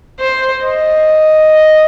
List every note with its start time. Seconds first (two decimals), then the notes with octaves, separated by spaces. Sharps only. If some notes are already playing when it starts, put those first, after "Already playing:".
0.20 C5
0.65 D#5